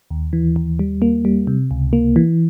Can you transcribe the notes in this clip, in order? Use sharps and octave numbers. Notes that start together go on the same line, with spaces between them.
D#2
E3
D#2
G3
A#3
G3
C3
C#2
A#3
E3